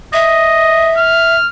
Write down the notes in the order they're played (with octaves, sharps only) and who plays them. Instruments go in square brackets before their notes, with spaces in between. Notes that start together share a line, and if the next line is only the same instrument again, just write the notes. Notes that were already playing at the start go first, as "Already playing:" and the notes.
[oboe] D#5 [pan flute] E5
[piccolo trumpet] F6